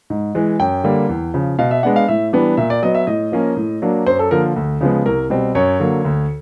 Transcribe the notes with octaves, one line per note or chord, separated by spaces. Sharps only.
G#2
E3 G#3
F#2 G5
D3 G3 A#3
E2
C#3 F3
B2 F5
E5
G#3 B3 D4 F#5
F5
A2 E5
E3 G3 B3 D4
A#2 E5
D5
F#3 B3 D#5
E5
A2 D#5
F3 A#3 C#4
A2
F#3 A#3 D4
F#2 C5
A4
D3 F3 A#3 A#4
D2
C#3 F3 G#3 B3
C2 A#4
B2 G3 C4
F#2 C#5
D3 F#3 A#3
D2